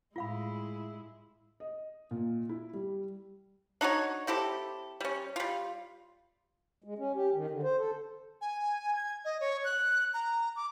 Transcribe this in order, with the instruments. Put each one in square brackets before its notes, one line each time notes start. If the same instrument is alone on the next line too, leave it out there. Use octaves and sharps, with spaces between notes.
[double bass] A2 [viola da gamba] G#3 E4 [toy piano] F4 F5 B5
[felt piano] D#5
A#2
E4
G3
[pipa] D4 D#4 F#4 C#5
C4 E4 G4 A4
G3 C#4
G3 F4
[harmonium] G#3
C#4
G4
D#3
D3
C5
A4
[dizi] G#5
G#6
D#5
C#5
F#6
A#5
D6